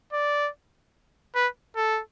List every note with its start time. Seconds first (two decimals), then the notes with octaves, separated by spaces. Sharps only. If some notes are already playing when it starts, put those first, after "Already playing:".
0.13 D5
1.35 B4
1.76 A4